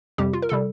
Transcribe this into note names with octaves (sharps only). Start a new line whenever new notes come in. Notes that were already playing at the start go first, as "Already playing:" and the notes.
F2 C3 G3 G4
F4
A#4
C3 G3 A4